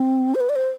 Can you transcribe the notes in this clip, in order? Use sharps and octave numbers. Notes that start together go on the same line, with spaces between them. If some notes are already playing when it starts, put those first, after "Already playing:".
Already playing: C4
C5
B4
D5
C5